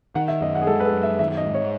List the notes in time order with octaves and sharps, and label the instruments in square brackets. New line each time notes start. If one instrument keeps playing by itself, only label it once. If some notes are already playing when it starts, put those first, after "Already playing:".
[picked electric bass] D#3 [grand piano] F#5
[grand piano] E5
[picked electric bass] F#2 [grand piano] D#5
[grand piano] F#5
G#4
[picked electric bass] G#3 [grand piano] A4
[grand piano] B4
A4
[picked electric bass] F#2
[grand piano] E5
[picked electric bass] D#3 [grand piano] E5
[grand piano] D#5
[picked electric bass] G#2
[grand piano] C#5